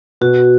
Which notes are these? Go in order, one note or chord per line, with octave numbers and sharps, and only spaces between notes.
B2 F#4